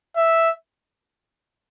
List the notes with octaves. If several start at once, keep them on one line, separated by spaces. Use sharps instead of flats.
E5